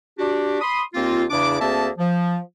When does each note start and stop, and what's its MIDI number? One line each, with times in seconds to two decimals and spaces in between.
0.18 0.58 62
0.18 0.58 66
0.18 0.58 67
0.61 0.82 83
0.61 0.82 84
0.61 0.82 87
0.94 1.24 39
0.94 1.24 58
0.94 1.24 60
0.94 1.24 65
1.30 1.56 40
1.30 1.56 49
1.30 1.56 62
1.30 1.56 64
1.30 1.56 86
1.59 1.88 38
1.59 1.88 58
1.59 1.88 60
1.59 1.88 68
1.59 1.88 76
1.59 1.88 81
1.97 2.38 53